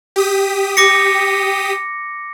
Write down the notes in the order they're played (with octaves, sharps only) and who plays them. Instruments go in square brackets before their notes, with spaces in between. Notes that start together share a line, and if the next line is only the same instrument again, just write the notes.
[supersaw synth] G4 D#6 B6
[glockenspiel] D6 A#6 C#7